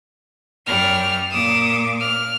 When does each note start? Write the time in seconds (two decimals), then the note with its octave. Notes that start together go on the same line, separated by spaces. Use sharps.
0.66 F#2 G3 G4 F6
1.32 A#2 D6 D#6 E7
2.00 F6